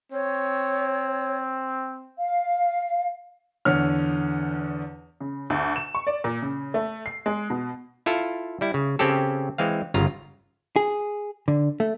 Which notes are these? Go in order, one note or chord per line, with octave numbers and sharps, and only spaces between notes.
C4 C#5
F5
E2 D3 C#5 F6
C#3
D2
E7
C#6
D5
A#2
C#3
A3
C7
G#3
B2
E4 F4 A4 F5
G3 E4
C#3
C#3 C4 C#4 G4 A4
E3 G#3 C4 F5
G1 C#3 F4 A#5
G#4
D3
A3